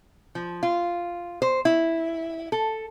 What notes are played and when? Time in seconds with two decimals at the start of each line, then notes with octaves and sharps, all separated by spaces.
0.35 F3
0.63 F4
1.42 C5
1.65 E4
2.52 A4